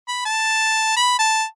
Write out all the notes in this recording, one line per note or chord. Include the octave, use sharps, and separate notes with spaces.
B5
A5
B5
A5